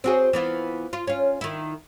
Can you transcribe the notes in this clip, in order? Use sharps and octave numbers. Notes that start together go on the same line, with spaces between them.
C4 F#4 G#4
E3 B3 F4
F4
C#4 F4
D#3 E4